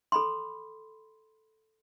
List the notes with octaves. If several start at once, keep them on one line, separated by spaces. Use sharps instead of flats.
A4 B5 C6